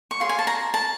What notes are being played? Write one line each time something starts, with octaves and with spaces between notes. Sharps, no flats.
C#6
F4 G#4 C#5 C6
G#5
A5
A#5
A5